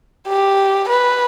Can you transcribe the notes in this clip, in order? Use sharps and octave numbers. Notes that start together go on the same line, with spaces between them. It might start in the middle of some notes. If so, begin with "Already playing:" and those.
G4
B4